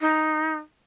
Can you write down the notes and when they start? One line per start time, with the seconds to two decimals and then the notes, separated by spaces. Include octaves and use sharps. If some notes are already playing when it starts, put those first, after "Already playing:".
0.01 D#4